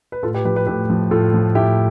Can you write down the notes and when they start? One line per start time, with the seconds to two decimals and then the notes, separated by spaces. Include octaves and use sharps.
0.12 B4
0.23 A2 F4 A4
0.34 G4 B4
0.45 F3 G4 B4
0.56 G4 B4
0.67 A2 G4 B4
0.90 F3
1.11 A2 F4 A4
1.34 F3
1.55 A2 E4 G4